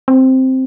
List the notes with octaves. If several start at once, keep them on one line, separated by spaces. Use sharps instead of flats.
C4